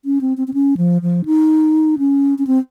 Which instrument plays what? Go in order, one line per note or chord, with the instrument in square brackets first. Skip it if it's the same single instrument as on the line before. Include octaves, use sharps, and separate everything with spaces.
[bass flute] C#4
C4
C4
C4
C#4
F3
F3
D#4
C#4
C#4
C4